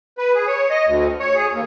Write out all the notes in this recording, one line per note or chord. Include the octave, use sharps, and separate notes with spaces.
B4
G#4
C#5
D#5
D2
C#5
G#4
D#2